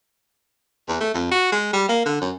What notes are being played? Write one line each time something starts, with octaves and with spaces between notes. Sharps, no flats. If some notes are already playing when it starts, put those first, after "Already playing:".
E2
A3
F2
F#4
G#3
G3
A#3
D3
F#2